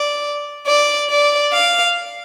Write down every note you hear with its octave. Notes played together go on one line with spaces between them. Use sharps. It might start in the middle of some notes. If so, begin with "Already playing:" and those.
Already playing: D5
D5
D5
F5